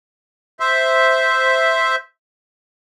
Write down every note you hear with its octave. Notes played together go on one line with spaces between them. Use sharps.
C5 E5